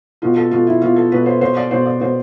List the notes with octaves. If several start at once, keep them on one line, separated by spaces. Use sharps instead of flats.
B2 F4
A4
B2 F4
E4
B2 F4
A4
B2 B4
C5
B2 C5
D5
B2 C5
D5
B2 C5